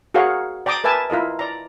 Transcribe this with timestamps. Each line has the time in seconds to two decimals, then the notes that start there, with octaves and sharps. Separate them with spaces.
0.14 F#4 G#4 A#4 C#5 F5 F#5
0.66 D5 G5 A#5 D6 D#6
0.84 A#4 B4 E5 G#5 A5
1.10 E4 F4 A#4 D#5
1.39 D5 A#5